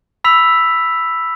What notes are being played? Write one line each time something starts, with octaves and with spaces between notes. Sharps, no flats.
B5 E6 B6 F7